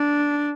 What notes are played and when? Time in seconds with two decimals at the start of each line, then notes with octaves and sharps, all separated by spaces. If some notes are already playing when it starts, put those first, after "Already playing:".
Already playing: D4